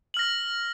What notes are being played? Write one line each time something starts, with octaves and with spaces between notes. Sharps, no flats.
F6 A#6 F#7